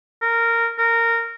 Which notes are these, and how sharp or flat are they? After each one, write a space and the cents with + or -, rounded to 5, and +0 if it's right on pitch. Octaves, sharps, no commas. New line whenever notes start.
A#4 -15
A#4 -15